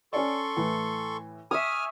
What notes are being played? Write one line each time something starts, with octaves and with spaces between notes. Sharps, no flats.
C#4 A4 D5 C6 C#6
A2 E3
E5 G#5 C#6 D#6 F6